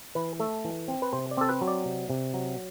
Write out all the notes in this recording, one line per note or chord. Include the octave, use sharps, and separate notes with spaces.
E3 B4
A3 A4
E3
C4
B4
C3 C5
D5
C4 A4
B4
F#3
D5
C3
C3
F#3